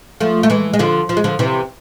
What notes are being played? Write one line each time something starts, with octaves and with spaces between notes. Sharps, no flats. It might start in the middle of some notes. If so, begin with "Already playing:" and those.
F3 A3
A3
E3 G#3
G#3
D3 F3
F3
G#3
D3 F3
C3 E3